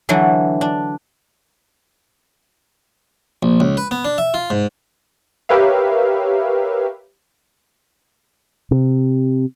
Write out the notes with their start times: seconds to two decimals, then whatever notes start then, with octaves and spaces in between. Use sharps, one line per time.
0.09 D3 E3 F#3 D4
0.61 D4
3.43 A#1
3.60 C#2
3.77 B4
3.91 B3
4.05 D4
4.18 E5
4.34 F4
4.50 G#2
5.49 G4 A#4 B4 C#5 E5 F5
8.71 C3